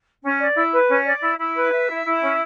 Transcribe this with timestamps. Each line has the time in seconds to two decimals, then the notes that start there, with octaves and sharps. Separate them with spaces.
0.23 C#4
0.40 D5
0.55 E4
0.72 B4
0.88 C#4
1.06 D5
1.21 E4
1.38 E4
1.55 B4
1.71 E5
1.89 E4
2.05 E4
2.22 C#4